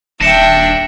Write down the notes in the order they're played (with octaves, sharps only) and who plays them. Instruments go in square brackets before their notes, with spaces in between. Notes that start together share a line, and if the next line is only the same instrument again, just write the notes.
[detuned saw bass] D#1 [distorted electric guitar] D4 A5 [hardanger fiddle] E5 G5 [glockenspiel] A#6 C#7 E7